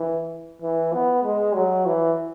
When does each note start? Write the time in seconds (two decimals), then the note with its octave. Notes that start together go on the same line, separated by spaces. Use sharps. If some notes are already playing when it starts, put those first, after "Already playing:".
Already playing: E3
0.62 E3
0.93 B3
1.24 G#3
1.55 F#3
1.86 E3